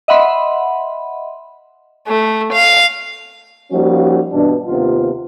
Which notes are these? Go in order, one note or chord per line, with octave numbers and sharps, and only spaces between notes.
D#5 E5 F#5 B5 C6
A3
F5
F3 G3 A#3 C#4 D#4 F#4
G2 B2 E3 D4
D#2 C3 B3 F4